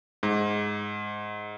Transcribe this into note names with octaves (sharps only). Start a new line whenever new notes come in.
G#2